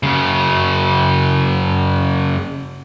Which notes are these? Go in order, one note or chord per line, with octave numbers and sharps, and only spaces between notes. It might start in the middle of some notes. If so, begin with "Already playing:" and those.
F#2 C#3